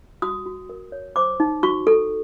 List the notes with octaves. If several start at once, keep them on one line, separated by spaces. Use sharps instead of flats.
F#4 D#6
F#4
A#4
C#5
C5 D6
D#4
F#4 C#6
A4